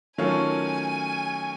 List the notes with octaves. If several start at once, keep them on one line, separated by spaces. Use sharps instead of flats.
D#3 F#3 A3 C#4 F4 G#5